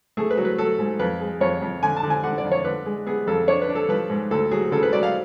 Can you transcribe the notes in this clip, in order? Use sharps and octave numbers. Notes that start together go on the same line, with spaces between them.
A3 G#4
B4
F#3
B4
F#3 A4
G#2
F2 B4
G#3
F2 C#5
F2
D3 G#5
A5
D3
G#5
D3 F#5
D5
F2
C#5
D3 B4
G#3
B3 G#4
F2 A4
D4 C#5
B4
D4
A4
F3 B4
G#2
D2 A4
F#3 G#4
C#3 A4
B4
F#3 D5
F5